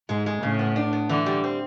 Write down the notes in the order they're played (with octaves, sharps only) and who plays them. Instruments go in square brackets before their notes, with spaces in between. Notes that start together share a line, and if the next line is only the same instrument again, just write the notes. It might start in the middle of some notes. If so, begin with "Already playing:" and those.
[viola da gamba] G#2 [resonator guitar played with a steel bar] G#3
[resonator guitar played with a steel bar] G#3
[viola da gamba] A2 [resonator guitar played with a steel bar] C#3
[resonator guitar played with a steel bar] B3
D4
B3
[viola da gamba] D3 [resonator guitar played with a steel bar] E3
[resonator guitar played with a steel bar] G3
C4